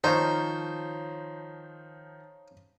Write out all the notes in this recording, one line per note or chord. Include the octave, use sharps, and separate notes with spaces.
D#3 F3 D#4 C5 C#5 F5 A5